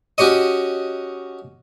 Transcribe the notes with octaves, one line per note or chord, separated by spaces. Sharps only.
C#4 F#4 G4 C#5 D#5